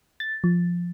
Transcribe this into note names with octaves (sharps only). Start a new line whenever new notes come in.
A6
F3